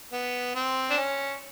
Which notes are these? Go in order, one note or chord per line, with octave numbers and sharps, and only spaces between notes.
B3
C4
D4
C#4